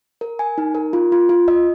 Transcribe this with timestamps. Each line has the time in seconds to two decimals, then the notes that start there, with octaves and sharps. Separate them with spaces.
0.21 A#4
0.39 G#5
0.58 D#4
0.75 A#4
0.93 F4
1.12 F4
1.29 F4
1.48 D#5